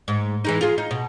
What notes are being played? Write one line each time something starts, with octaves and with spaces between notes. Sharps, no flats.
G#2
E3 G#3 D#4
F4 G#4
D#4
B2